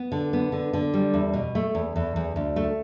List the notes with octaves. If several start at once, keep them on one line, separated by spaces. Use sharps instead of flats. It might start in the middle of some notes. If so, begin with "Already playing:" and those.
Already playing: B3
D3
B3
D3
D3
G3
E2
B2
A3
E2
E2
E2
D2
A3